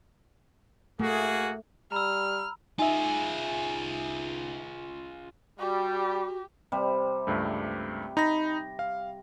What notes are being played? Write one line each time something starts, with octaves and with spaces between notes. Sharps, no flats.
A3 A#3 F#4 G#4
G3 A#5 B5 E6 F6
D#4 F4 G#4 E5 G#5
G3 F#4 G4
C3 G3
C#2 G2 A3
D#4 B5 A#6
F5